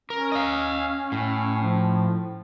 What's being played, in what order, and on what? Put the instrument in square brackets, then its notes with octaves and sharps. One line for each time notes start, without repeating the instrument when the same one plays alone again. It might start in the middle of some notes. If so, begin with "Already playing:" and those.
[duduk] C#4 [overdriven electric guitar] A#4
[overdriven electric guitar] D#5 F5
A2
[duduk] F3